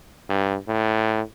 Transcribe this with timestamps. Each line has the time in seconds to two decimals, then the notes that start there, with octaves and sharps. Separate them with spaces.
0.29 G2
0.68 A2